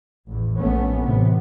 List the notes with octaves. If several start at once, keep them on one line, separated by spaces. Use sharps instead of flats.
A1 E2
A#1 A3 B3 C#4
A1 C3 B3